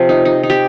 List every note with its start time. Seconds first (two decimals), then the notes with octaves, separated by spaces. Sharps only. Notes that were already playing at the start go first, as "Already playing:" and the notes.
Already playing: C3 F3
0.09 D#4
0.25 D#4
0.43 D#4
0.50 G4